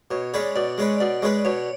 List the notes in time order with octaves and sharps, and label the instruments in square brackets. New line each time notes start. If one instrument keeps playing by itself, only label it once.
[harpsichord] B2 [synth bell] C#5
[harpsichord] G#3 C#4 G#4 B4 [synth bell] D5
[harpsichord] B2 [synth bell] D5
[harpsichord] G#3 C#4 G#4 B4
[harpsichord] B2 [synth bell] D5
[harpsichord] G#3 C#4 G#4 B4
[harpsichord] B2 [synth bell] C#5